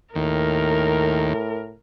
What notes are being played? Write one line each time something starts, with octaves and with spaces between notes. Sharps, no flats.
D#2 A2 A#4